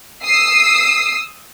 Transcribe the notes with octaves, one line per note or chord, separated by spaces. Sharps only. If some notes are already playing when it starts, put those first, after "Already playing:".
D#6 E6 C7